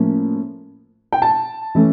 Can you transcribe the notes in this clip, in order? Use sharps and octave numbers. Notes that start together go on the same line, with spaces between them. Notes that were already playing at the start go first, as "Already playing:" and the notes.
Already playing: A2 F3 A#3 C#4
G5
A5
E3 A3 C#4